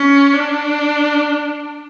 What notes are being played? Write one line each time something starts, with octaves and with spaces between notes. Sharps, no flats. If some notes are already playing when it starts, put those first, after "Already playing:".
Already playing: C#4
D4